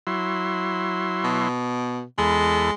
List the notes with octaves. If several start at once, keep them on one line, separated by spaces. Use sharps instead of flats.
F#3 E4 C6
B2
E2 G#3 A4 B5